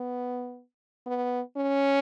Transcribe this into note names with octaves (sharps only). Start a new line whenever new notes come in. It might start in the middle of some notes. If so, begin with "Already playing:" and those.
Already playing: B3
B3
C#4